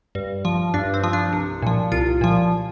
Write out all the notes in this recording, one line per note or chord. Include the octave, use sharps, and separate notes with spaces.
G2
F3
G2 D4
C4
F3
D4
C2
A#2 F3
C2 F4
A#2 F3